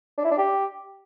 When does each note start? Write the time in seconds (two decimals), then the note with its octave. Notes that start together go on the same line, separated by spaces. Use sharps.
0.18 D4
0.25 E4
0.31 D4
0.38 G4